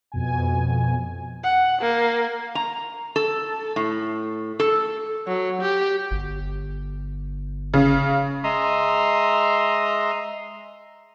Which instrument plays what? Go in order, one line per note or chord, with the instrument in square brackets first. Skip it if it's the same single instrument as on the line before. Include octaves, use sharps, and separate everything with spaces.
[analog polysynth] F2 B2 G#5
[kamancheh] F#5
A#3
[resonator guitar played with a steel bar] A#5
A4
A2
A4
[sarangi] F#3
G4
[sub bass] G1
[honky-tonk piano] C#3
[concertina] G#3 E5 A#5 C6 D#6